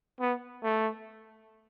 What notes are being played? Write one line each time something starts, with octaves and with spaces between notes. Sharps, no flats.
B3
A3